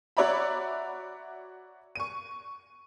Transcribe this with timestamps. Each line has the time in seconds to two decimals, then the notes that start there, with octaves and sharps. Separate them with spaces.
0.17 F#4 C#5 D5 E5 A#5 B5
1.95 C#6 D#7